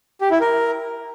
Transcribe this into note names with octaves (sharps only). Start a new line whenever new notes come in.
G4
E4
A#4